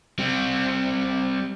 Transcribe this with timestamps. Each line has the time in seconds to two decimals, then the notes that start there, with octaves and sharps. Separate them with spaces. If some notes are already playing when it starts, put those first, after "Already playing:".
0.19 G3 C4